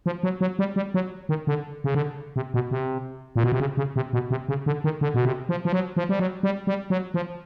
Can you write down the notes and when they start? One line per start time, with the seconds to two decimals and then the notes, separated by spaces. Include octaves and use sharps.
0.06 F3
0.23 F#3
0.41 F#3
0.59 G3
0.76 G3
0.94 F#3
1.29 D#3
1.47 D3
1.84 C#3
1.95 D3
2.36 C3
2.54 B2
2.71 C3
3.36 A#2
3.44 B2
3.52 C3
3.60 C#3
3.77 C#3
3.96 C3
4.13 B2
4.31 C3
4.49 C#3
4.66 D3
4.84 D#3
5.01 D3
5.14 B2
5.25 C3
5.49 F3
5.65 F3
5.73 F#3
5.96 F3
6.09 G3
6.19 F#3
6.43 G3
6.67 G3
6.90 F#3
7.14 F3